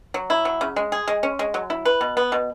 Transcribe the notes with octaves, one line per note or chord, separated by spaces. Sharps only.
F#3
E4
F#3
C#3
G#3
G#4
G#3
C#4
G#3
F#3
E4
B4
B2
B3
B2